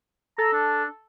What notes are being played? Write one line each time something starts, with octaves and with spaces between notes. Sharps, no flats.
A4 A#5
D4